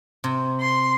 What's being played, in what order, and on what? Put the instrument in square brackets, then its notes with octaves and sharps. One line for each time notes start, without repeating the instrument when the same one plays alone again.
[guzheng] C3
[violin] C6